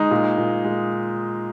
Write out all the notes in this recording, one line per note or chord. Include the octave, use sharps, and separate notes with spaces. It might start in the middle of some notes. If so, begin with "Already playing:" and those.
Already playing: G#3 D#4
A#2
A#2
G#3